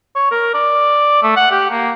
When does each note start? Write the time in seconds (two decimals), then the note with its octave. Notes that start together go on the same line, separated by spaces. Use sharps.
0.15 C#5
0.31 A#4
0.54 D5
1.23 A3
1.36 F#5
1.51 G4
1.71 A#3